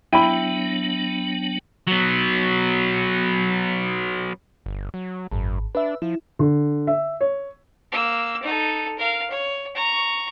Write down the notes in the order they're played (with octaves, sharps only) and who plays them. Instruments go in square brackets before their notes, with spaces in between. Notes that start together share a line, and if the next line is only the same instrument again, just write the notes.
[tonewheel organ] F#3 B3 D4 [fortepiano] E4 B5 [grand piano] G5 D7 D#7
[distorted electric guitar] F#3 B3
[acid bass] G1
F#3
[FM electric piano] G#1 [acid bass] F#2
[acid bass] D4 [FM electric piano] B4 E5
[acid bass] F3 [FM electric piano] E4
[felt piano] D3
E5
C#5
[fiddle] A#3 E6
D#4 A4
A#4 F5
C#5
A#5 C#6